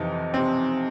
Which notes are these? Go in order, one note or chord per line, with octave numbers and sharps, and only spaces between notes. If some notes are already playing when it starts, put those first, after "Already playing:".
Already playing: F2 C3 E3 D#4
C3 C4